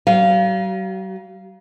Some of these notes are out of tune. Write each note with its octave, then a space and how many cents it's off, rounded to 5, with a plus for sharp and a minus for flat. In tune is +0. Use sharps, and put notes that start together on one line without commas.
F#3 +45 F5 -10